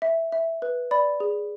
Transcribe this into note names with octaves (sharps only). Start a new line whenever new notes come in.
E5
E5
B4
D5 B5
G#4